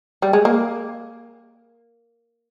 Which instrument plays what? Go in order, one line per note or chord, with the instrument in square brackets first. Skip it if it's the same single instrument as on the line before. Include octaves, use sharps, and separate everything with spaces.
[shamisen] G3
G#3
A#3